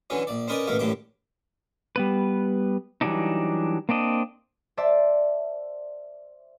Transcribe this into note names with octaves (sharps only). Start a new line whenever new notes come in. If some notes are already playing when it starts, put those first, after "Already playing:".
D3 E3 F#3 C#4
A#1 D5
C4 C#4 D#4 A#4 B4 D5
A1 B2 A3 A#3 A#4
A1 F#2 A2 G3 G5 D6
G3 B3 B4
E3 F#3 G3 C4 D4 D#4
A#3 C4 D4 D#5
C5 D5 E5 G5 A5